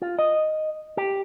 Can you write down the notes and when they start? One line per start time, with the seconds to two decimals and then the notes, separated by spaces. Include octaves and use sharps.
0.02 F4
0.19 D#5
0.97 G4